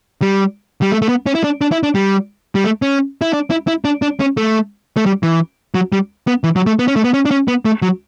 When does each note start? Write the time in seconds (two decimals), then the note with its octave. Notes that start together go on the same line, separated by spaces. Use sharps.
0.22 G3
0.82 G3
0.92 A3
1.02 A3
1.09 B3
1.26 C#4
1.35 E4
1.44 D4
1.61 D4
1.72 E4
1.83 D4
1.95 G3
2.55 G3
2.64 A3
2.82 C#4
3.22 E4
3.33 D4
3.50 E4
3.67 E4
3.85 D4
4.02 D4
4.20 C#4
4.37 A3
4.97 A3
5.06 G3
5.23 E3
5.75 F#3
5.92 G3
6.27 B3
6.44 E3
6.56 F#3
6.66 A3
6.79 B3
6.88 C#4
6.96 A3
7.04 B3
7.14 C#4
7.25 D4
7.31 C#4
7.48 B3
7.65 A3
7.82 F#3